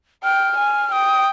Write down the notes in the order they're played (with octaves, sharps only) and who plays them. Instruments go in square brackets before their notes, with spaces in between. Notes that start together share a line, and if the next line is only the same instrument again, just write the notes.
[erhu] G5 [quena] F6
[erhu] G#5
[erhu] G5 [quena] D#6